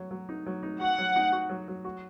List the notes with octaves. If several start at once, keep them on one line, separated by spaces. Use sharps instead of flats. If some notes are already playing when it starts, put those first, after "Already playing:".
Already playing: F#3 C#5
F#3
D#4
F#3
D#4
F#4 F#5
F#3
D#4
F#4
F#3
F#3
F#4